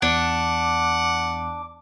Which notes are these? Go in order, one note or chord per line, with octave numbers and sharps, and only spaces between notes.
E2 D4 F#5 D6